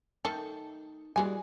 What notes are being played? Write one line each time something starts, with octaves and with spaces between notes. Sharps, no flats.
D#3 A3 D#4 A4
E3 G3 G#3 F#4 D5 G#5